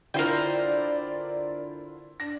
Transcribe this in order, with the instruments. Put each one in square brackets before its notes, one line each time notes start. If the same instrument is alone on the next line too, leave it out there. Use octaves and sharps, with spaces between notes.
[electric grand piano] D3 E4 F4 [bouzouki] A#4 C5 G5 [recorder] D5
[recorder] D4 [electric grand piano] A#6